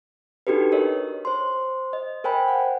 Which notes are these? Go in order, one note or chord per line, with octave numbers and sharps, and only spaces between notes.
D4 D#4 F#4 G4 A4 B4
A#4 C#5 D#5
C5 C6
D#5
A#4 C5 G5 G#5 B5
F#5